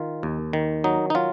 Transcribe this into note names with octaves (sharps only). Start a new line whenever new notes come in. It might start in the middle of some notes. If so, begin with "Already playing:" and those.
Already playing: D#3 F4
D#2
D#3
F#3 D#4
D#4
F#3 F4